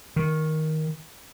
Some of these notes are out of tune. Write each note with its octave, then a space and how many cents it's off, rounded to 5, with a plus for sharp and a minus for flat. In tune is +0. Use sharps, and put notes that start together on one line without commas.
D#3 +10